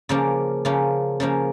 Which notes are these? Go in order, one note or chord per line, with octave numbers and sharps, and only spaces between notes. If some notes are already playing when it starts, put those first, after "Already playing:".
C#3 F3 A#3 C#4 D5
C#3 F3 A#3 C#4
C#3 F3 A#3 C#4